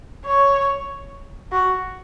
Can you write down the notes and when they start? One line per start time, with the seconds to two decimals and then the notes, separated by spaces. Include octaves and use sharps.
0.25 C#5
1.52 F#4